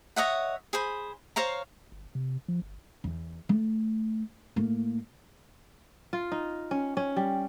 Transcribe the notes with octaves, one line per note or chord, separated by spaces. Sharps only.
C#5 D#5 E5 F#5
G#4 C5 B5
C5 C#5 F5 A#5
G1
C3
F3
G1
E2
A3
A2 A#3
F4
D#4
C#4
C#4
G3